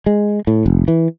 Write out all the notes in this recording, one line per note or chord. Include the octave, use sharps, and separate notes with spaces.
G#3
A2
F1
E3